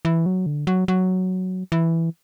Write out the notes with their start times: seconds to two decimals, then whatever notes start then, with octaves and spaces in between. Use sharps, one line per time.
0.05 E3
0.26 F#3
0.46 D3
0.67 F#3
0.88 F#3
1.72 E3